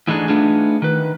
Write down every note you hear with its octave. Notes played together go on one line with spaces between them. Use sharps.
G#2 E3 G#3 A3 D4 D#4
A3 B3 D4 D#4 F4 G#4
D#3 B4